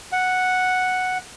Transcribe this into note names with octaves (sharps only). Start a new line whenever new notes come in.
F#5